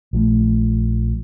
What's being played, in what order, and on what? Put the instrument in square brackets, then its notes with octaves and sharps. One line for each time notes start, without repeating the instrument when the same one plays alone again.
[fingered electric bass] A#1 F3 A3